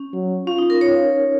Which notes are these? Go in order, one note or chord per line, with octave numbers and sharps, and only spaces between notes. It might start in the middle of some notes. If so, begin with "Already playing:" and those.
Already playing: C#4
F#3
C#4 F4
D#4
A#4
C#5